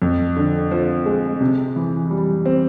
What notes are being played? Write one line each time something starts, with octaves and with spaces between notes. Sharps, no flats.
F2
D3
F3
G#3
C3
E3
G3
C4